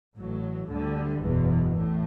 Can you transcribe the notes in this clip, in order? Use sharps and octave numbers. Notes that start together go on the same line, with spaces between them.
A1 A2 F#3
D2 D3 G3
F#1 E2 B2
A1 A2